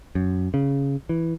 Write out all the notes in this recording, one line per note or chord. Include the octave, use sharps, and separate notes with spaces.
F#2
C#3
E3